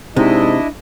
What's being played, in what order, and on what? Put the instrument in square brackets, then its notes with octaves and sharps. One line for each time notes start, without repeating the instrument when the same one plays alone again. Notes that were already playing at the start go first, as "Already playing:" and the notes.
[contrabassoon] G#2 [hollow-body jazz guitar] C3 [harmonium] D4 E4 D#5